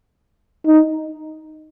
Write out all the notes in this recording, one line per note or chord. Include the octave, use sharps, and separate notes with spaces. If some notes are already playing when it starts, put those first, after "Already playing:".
D#4